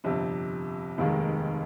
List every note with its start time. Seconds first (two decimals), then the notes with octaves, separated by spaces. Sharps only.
0.04 G1 F2 C3
0.98 F1 D#2 D#3 G#3